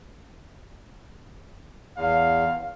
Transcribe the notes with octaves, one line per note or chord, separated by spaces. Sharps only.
E2 F5